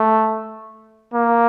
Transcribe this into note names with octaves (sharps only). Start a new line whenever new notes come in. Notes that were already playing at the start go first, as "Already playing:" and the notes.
Already playing: A3
A#3